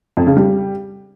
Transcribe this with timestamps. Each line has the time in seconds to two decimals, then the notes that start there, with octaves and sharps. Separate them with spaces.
0.17 F2
0.27 C#3
0.37 G3